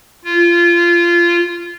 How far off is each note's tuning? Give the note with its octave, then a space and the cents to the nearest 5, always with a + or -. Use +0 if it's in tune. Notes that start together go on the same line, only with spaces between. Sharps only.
F4 -20